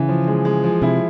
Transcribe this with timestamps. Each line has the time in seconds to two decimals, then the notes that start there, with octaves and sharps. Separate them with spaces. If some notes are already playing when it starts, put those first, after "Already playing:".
Already playing: C#3 E3
0.09 F3
0.27 G#3
0.45 G#3
0.64 F3
0.82 C3 E4